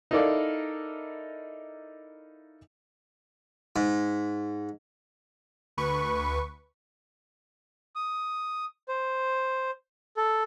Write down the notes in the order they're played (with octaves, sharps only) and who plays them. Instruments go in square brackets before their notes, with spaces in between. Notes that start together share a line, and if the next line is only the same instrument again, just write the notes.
[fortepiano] D#4 E4 A4 A#4 D5 F5
[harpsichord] G#2
[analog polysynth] D2 B4 C#6
[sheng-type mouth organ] D#6
C5
A4